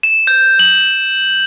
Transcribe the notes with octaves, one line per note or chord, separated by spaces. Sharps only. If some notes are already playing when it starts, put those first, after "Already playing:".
E7
G6
F#7